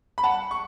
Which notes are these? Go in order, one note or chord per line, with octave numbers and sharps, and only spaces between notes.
B5
F#5 A5
C#6